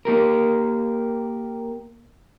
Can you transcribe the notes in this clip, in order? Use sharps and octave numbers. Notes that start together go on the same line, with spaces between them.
A#3 G4 A#4